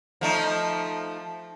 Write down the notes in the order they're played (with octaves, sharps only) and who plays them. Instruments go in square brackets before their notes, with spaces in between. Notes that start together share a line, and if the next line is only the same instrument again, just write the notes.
[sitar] F3 A3 D#4